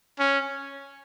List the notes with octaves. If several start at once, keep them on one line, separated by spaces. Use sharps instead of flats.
C#4